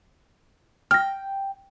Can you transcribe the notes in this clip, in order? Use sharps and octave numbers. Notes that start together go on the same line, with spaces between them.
G5 F6 A#6